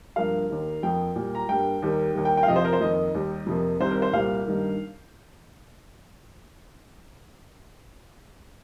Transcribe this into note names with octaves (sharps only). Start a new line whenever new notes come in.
G2 F3 A#3 F5
D#2 D#3 A#3
F2 F3 A#3 G5
A#2 G3 A#3
A#5
G2 G3 A#3 G5
D#2 D#3 G3 A#3
D#2 D#3 G3 A#3
G5
G5
F5
F2 C3 F3 D#5
C5
A#4
C5
F2 D#3 A#3 D#5
D#2 D#3 G3
F2 C3 F3 A#3
C2 C3 D#3 G3 C5
A#4
C5
C2 A#2 G3 A#3 F5
G2 D#3 G3 A#3